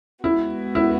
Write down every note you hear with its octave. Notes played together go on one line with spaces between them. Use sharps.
G#3 B3 E4 F#4
E4